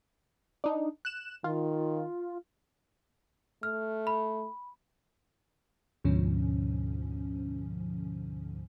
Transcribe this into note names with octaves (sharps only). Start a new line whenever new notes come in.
D4 D#4
F#6 E7
D#3 F4
A3 F6
B5
D2 G#2 B2 D3 F3 C#4